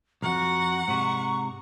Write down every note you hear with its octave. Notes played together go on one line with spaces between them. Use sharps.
B1 F2 F#4 F#5 A#5 C#6
G#2 C3 C#6